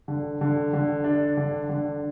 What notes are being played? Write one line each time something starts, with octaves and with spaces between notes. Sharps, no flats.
D3
D3
D3
D4
D3
D3